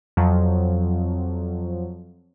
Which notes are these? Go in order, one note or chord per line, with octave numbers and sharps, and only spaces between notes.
F2 F3 F#3